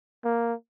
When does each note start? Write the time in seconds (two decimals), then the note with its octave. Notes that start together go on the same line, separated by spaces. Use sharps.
0.24 A#3